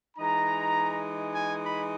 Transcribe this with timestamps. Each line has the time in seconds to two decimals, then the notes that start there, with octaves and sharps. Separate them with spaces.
0.17 E3 G#3 D#4 A#5
1.33 G#5
1.63 B5